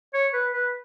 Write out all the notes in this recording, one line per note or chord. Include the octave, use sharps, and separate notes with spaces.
C#5
B4
B4